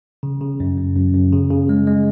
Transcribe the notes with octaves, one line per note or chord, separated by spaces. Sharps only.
C#3
C#3
F#2
F#2
F#2
F#2
C#3
C#3
G#3
G#3